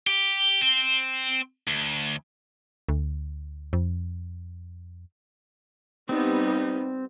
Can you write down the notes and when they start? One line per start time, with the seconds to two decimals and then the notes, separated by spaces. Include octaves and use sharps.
0.07 G4
0.62 C4
1.67 D2
2.89 D2
3.73 F2
6.09 G3 B3 C4 D#4